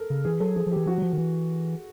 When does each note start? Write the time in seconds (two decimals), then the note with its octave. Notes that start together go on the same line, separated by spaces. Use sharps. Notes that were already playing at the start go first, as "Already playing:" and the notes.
Already playing: A4 A#4
0.10 C#3
0.25 E3 G#4
0.40 F#3 A4
0.56 F3 G#4
0.66 F3
0.72 E3 G4
0.86 F3 F#4
0.98 F#3
1.02 F3
1.12 D#3
1.18 E3